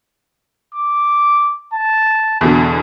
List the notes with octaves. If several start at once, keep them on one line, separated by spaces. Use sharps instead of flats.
D6
A5
E2 B2 D3 A4